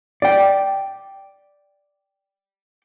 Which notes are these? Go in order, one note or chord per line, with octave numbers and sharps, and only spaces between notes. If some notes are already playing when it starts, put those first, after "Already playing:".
D5 G5